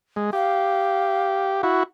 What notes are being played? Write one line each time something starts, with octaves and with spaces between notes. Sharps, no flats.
G#3
G4 F5
E4 F#4